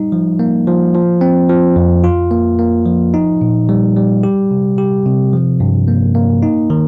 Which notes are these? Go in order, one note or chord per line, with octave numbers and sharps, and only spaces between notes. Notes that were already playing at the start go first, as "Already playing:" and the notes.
Already playing: G3 D#4
F3
A#3
F3
F3
C4
F3
F2
F4
A#3
A#3
F3
D#4
A#2
G3
G3
G4
C3
G4
C3
F3
G2
A#3
A#3
D#4
D#3